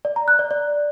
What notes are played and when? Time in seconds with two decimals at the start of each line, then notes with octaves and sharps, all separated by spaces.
0.05 D5
0.16 A#5
0.28 F#6
0.39 D5
0.51 D5